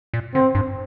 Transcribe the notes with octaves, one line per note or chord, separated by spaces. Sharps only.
A#2
D3 C4
G2